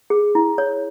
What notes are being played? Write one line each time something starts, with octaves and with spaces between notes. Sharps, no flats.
G#4
E4
C#5